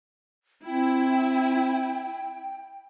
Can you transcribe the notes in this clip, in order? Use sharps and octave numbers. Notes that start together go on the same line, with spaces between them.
C4 E4 G5